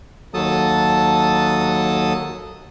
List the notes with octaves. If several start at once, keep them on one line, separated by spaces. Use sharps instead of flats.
D#2 F#3 A4 A5 D#6